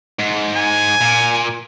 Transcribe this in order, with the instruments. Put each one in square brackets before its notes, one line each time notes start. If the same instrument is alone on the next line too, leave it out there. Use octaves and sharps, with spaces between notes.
[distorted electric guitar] G#2
[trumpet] G#5
[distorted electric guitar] A#2